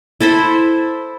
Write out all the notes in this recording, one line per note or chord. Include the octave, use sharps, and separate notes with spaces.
E4 A4 C5 B5